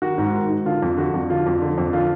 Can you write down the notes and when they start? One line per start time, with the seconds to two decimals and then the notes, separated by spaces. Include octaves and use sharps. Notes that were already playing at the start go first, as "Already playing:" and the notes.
0.02 D#3 F#4
0.18 G#2
0.35 D#3
0.50 G#2
0.65 D3 F4
0.82 F2
0.97 D3 F#4
1.14 F2
1.30 D3 F4
1.46 F2
1.62 D3
1.78 F2
1.93 D3 F4